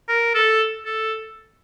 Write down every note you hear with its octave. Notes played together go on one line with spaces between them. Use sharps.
A#4
A4
A4